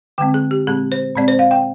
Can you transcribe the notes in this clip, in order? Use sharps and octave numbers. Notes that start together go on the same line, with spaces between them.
D3 G#3 C4 G5
G#4
G4
A#2 G#3 C4 G#4
C5
A#2 G#3 C4 D5
C5
F5
G5